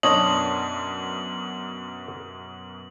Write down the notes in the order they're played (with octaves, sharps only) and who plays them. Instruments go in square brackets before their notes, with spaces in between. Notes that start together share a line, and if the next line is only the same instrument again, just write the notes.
[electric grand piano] F#2 B2 [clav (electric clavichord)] D4 C#5 D#5 [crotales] F#7